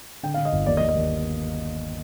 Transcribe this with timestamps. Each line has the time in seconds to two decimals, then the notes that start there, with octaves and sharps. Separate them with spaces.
0.23 D3 G5
0.34 F5
0.37 D3
0.45 D#5
0.52 G1
0.66 D#2 D5
0.77 D#5
0.81 D#2
0.89 D#5
0.95 D#2